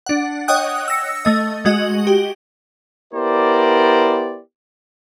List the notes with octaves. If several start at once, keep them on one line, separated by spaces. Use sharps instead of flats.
D4 F#5
C#5 D#5 F#5 G5 D#6 F#6
E6 A#6 C#7
A3 D#5
G#3 F#4 D#5 F#7
G4
B3 E4 G4 A#4 C5 D5